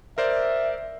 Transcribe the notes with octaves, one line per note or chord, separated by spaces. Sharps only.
A#4 C5 D5 E5